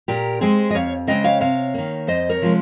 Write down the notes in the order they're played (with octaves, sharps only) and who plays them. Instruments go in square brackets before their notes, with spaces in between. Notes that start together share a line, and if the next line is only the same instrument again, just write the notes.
[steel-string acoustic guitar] A#2 G4 A#4
G#3 C4 G#4 C5
D#5
F2 C#5 F5
C#3 G#3 C4 D#5 G5
C#5 F5
C3 C#5 F5
D#3 A#3
F2 C5 D#5
A#4 C#5
C3 F3 G#3